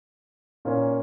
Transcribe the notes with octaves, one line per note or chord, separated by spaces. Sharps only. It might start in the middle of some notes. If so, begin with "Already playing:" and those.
A#2 A#3 C#4